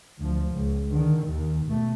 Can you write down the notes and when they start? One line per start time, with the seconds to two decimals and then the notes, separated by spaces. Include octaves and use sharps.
0.19 D2 F3
0.51 C#2
0.90 D3 D#3
1.26 D#2
1.65 B2 A3